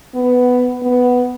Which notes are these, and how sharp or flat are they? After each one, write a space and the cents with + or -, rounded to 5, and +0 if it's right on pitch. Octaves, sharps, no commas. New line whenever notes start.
B3 +10
B3 +5